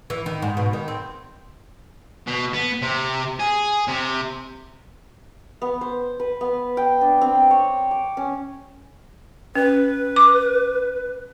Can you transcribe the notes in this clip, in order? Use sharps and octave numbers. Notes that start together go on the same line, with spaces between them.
E3
D#3
G#2
B2
D#3
C4
B2
B3
C3
G#4
C3
B3
C5
B4
B3
G5
D4
C4
C#5
D6
C#4
C#4 B4
D6